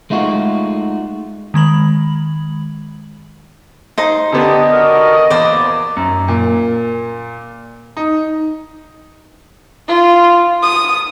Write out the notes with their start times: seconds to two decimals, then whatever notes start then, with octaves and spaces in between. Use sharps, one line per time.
0.10 G#3 A3 D#4 F4 F#4
1.54 D#3 G#3 B5 F#7
3.98 D#4 C5
4.32 D3 B3 D4 G4 D#5
4.72 F#4 A#4
5.30 E2 A#3 C5 D5
5.96 F#2
6.28 A#2
7.97 D#4
9.88 F4
10.63 D#6